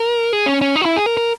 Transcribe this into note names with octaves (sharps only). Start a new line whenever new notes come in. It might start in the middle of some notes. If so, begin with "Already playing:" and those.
Already playing: A#4
G#4
C#4
C#4
D#4
F#4
E4
G#4
A#4
A#4